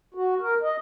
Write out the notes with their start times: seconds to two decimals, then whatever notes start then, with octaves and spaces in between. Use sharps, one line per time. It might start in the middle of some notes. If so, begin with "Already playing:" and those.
0.15 F#4
0.41 A#4
0.62 D#5